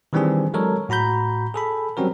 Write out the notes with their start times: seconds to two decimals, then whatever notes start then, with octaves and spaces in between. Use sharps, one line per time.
0.13 D#3 E3 G3 C4 D4 G#4
0.54 F#3 G#3 A4 A#4 C#5
0.89 A2 F#4 A#5 B5 G6
1.54 G#4 A4 B5
1.97 F#3 G3 C4 C#4 F#4 A#4